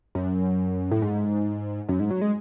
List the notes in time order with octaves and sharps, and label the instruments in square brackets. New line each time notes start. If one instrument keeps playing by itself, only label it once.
[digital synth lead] F#2
A2
G#2
F#2
G#2
F#3
G#3